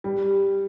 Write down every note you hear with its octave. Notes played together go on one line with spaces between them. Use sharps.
G3